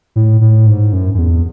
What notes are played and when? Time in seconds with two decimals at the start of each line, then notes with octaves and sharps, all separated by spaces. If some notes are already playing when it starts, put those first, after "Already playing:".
0.16 A2
0.41 A2
0.67 G#2
0.93 F#2
1.14 F#2
1.18 E2